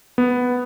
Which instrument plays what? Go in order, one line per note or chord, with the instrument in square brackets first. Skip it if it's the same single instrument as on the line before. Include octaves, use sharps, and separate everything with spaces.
[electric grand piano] B3